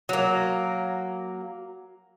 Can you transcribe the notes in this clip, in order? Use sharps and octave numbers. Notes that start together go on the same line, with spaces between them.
F#3 A#3